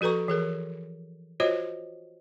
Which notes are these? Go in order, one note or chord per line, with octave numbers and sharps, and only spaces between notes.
F3 F#4 A4 B4 A#5 C#6
E3 G#4 A#4
F4 F#4 C5 C#5 D#5